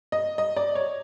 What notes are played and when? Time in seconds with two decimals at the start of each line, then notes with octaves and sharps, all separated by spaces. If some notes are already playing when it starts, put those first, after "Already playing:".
0.12 D#5
0.38 D#5
0.56 D5
0.75 C#5